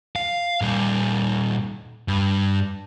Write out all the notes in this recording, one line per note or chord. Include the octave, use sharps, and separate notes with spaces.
F5
A#2 G3
G2